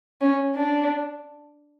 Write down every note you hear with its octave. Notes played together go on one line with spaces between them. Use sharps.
C#4
D4